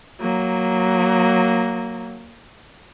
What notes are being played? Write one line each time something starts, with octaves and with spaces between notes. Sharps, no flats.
F#3 A#3